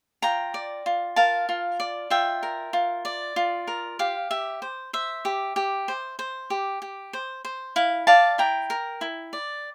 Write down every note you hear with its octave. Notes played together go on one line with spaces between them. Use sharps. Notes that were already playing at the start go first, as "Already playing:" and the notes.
F4 G5 A#5
D5
F4
A#4 F5 A5
F4
D5
F4 E5 G5
A#4
F4
D5
F4
A#4
G4 F5
G4 E5
C5
C5 E5
G4
G4
C5
C5
G4
G4
C5
C5
E4 F5
D5 F5 A5
E4 G5 A#5
A#4
E4
D5